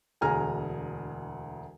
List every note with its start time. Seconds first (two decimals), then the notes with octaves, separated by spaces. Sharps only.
0.21 E1 D2 G#4 G#5 A#5 F6